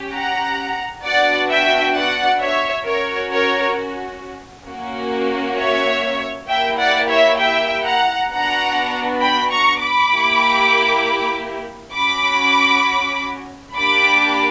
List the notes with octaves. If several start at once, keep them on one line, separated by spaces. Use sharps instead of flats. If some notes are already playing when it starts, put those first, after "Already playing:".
Already playing: C#4 G4
F#5 A#5
B3 D4 F#4 D5 F#5
E5 G5
D5 F#5
C#5 E5
C#4 F#4 A#4 C#5
A#4 C#5
A#3 C#4 F#4
C#5 E5
A#3 E4 G4 E5 G5
D5 F#5
C#5 E5
E5 G5
F#5 A#5
B3 D4 F#4 F#5 A#5
G5 B5
A#5 C#6
B5 D6
A#3 E4 G4
C#4 F#4 B5 D6
A#3 D4 G4 B5 D6